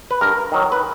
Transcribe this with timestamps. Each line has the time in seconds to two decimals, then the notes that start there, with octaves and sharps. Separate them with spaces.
0.11 B4
0.21 G2 A#4
0.52 D#3 F#3
0.72 B4